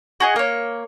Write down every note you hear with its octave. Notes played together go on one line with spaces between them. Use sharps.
F#4 G#4 D#5
A#3 C#5